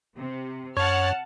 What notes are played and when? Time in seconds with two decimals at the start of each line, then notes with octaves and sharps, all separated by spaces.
0.18 C3
0.77 F#2 C#5 F#5 A5 F6